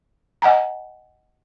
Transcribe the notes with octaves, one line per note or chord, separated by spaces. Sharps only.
D#5 F#5 G#5 A#5